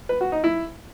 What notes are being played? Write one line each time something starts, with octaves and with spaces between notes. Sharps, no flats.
B4
F#4
D#4
E4